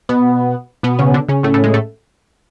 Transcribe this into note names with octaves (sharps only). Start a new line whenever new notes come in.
B2 B3
B2 B3
C#3 C#4
D3 D4
C#3 C#4
A2 A3
A2 A3
G#3
A2 A3